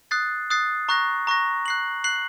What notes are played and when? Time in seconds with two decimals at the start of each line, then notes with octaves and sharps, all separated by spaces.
0.11 D#6 F#6 A6 C7
0.50 D#6 F#6 A6 C7
0.89 A#5 C#6 F#6 A#6
1.27 A#5 C#6 F#6 A#6
1.66 F#6 C7 F#7
2.04 F#6 C7 F#7